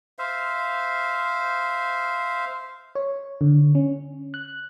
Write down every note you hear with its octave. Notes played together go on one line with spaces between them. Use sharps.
C5 E5 F5
C#5
D3
C#4
F#6